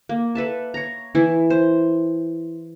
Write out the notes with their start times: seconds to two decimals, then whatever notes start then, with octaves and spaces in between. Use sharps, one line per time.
0.09 A#3
0.35 A4 B4 E5 A5
0.74 C#5 A#5
1.15 E3 E4 E5
1.50 C5